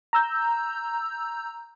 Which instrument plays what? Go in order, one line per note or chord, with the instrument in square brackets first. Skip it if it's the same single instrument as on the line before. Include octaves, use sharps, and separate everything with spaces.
[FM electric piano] A#5 E6 G6